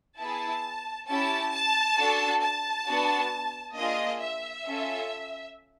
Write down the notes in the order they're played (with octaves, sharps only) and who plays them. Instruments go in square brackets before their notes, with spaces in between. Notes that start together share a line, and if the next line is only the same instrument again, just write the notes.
[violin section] B3 E4 G#4 A5
C#4 E4 G4 A5
A5
D4 F#4 A4
A5
B3 D4 F#4
A#3 D4 F4 G#4 D#5
E5
C#4 F4 A4